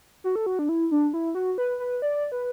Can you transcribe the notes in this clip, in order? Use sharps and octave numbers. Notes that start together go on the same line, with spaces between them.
F#4
A4
F#4
D4
E4
D4
E4
F#4
B4
B4
D5
B4